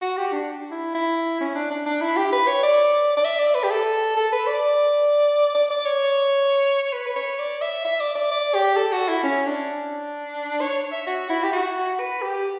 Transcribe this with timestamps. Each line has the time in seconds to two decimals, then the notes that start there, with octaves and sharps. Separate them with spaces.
0.02 F#4
0.17 G4
0.32 D4
0.71 E4
0.94 E4
1.41 C#4
1.55 D4
1.71 D4
1.86 D4
2.01 E4
2.17 G4
2.32 B4
2.47 C#5
2.63 D5
3.17 D5
3.25 E5
3.39 D5
3.55 B4
3.64 G4
3.71 A4
4.16 A4
4.32 B4
4.47 D5
5.54 D5
5.70 D5
5.85 C#5
6.93 B4
7.06 B4
7.16 C#5
7.39 D5
7.62 E5
7.84 E5
8.00 D5
8.15 D5
8.31 D5
8.54 G4
8.76 A4
8.92 F#4
9.08 E4
9.23 C#4
9.46 D4
10.61 C#5
10.92 E5
11.07 F#4
11.29 E4
11.43 G4
11.53 F#4
11.99 B4
12.22 G4